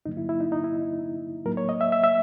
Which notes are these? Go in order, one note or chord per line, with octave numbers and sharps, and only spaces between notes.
G2 D3 F#3 A#3 D#4
E4
E4
D#4
D#4
E4
A2 F#3 A#3 A#4
C#5
D#5
E5
E5
E5